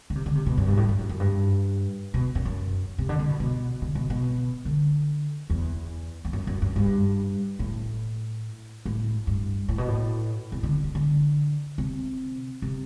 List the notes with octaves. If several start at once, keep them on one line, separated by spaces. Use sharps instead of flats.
D3
C3
D3
C3
B2
F#2
G2
A2
G2
F#2
F#2
G2
B2
F#2
F#2
C3
D3
D3
B2
B2
D3
B2
B2
D3
E2
E2
F#2
F#2
F#2
G2
A2
A2
G2
A2
B2
A2
C3
D3
D3
D3
C3
C3